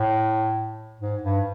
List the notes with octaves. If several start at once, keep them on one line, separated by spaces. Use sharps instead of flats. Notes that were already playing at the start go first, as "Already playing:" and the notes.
Already playing: A2
G#2
G2